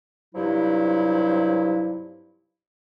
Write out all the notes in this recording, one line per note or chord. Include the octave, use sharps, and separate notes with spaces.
G2 C3 F3 F#3 D#4 E4